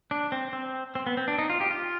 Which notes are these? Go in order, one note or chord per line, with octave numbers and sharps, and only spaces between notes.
D4
C4
C4
C4
B3
C4
D4
D#4
F4
G4
F4